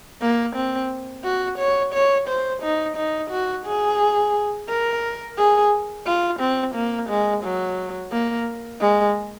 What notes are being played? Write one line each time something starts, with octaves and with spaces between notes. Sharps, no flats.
A#3
C4
F#4
C#5
C#5
C5
D#4
D#4
F#4
G#4
A#4
G#4
F4
C4
A#3
G#3
F#3
A#3
G#3